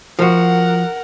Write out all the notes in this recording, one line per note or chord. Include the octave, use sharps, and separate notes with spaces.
F3 F#4 A#4 F#5